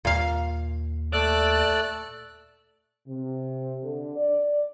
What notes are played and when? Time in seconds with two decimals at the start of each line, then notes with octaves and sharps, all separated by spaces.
0.05 D#2 A#2 F5
1.13 A3 D5 E6 F#6
3.07 C3
3.83 D3
4.15 D5